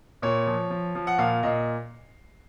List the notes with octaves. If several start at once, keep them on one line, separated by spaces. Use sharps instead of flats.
A#2 C#5
F3
F3
F3
F#5
A#2 F5
A#2 D#5